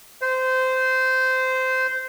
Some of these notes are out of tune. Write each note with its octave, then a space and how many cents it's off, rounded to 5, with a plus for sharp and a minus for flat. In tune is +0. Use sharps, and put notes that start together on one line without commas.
C5 -15